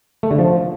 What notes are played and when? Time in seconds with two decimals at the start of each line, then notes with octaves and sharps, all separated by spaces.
0.23 A3
0.31 D3
0.38 F3